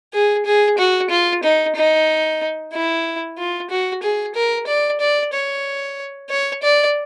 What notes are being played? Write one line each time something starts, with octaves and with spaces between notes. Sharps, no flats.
G#4
G#4
F#4
F4
D#4
D#4
E4
F4
F#4
G#4
A#4
D5
D5
C#5
C#5
D5